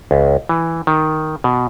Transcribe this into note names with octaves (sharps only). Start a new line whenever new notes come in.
C#2
E3
D#3
B2